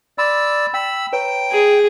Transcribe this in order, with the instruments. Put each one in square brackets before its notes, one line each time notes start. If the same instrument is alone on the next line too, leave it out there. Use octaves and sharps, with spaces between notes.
[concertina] D5 E6 [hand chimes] B5 C6
[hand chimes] G5 [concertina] B5 E6
[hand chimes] B4 C#5 A#5 [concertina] G5
[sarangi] G#4